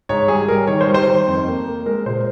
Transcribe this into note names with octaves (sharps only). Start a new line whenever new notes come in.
G#2 C#5
G3 G#4
G3 A#4
D#3 C#5
C5
G3
C5
D#3
F2
A#3
A#3
G#3 A#4
A#2 C5